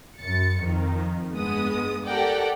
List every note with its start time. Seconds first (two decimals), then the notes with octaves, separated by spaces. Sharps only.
0.18 F#2 A6 C#7
0.60 F2 D#3
1.34 G2 G#3 B3 D#6
2.06 G4 A4 A#4 D5 F#5 G5